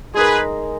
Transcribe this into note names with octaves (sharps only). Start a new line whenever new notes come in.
G#3 D#4 G#4 A#4 B4